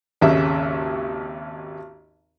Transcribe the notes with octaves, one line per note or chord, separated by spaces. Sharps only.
G#1 D#2 C#3 E5